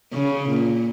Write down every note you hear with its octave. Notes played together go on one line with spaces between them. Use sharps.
C#3
A#2